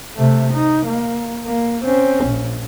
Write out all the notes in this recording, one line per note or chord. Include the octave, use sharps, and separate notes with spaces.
C3 A3
D#4
A#3
A#3
C4 C#4
A#1